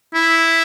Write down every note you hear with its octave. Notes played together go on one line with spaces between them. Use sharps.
E4